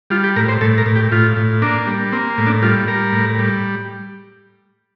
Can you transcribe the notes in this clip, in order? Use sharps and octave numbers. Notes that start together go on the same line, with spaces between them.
G3 F4
G4
A2 A#4
C5
A2 A4
A#4
A2
G4
A2 F4
A2
A#3 D4
G3
A#3 C4
A2
D4
G3 F4
G3 A#4
A2
G3